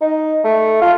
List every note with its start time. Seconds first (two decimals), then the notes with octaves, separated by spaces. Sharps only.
0.01 D#4
0.44 A3
0.81 F4